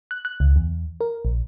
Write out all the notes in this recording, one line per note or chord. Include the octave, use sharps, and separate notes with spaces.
F#6
F#6
C#2
E2
A#4
A#1